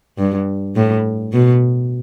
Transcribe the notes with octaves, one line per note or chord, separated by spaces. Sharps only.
G2
A2
B2